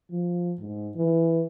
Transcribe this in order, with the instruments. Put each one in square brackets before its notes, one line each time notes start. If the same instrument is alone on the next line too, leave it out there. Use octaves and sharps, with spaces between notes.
[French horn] F3
G#2
E3